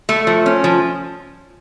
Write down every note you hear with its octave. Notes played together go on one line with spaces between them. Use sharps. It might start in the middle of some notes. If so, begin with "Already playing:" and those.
A3
F3
C#4
F3